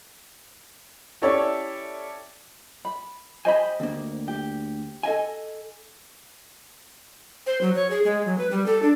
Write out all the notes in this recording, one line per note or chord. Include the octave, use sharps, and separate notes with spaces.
C#4 E4 G4 A4 C#5 D5
B5
G4 C5 D#5 G#5 B5
D2 A#3
G4
A4 D#5 G#5
C5
F#3
C#5
G#4
G#3
F#3
B4
G3
A4
D4